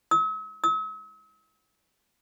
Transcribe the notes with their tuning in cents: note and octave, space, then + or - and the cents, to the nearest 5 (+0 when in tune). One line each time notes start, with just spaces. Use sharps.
E6 -45
E6 -45